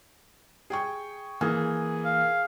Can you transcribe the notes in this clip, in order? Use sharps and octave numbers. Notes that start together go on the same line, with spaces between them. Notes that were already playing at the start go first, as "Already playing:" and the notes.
G#4 G5 C#6
E3 A#3 G#4
F5